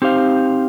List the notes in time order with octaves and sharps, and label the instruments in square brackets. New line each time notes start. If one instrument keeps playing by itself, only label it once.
[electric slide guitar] C4 D#4 G4 C5 F5